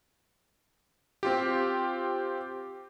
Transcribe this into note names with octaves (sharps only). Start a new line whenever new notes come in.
C4 F4 G4